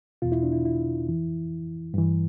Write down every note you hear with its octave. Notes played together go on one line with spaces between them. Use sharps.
E2 B2 F4
E4
D4
E4
E4
F2 E3
G2 E3